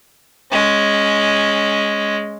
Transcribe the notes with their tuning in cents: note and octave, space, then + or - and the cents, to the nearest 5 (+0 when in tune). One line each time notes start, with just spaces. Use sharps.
G#3 +0 C#4 +0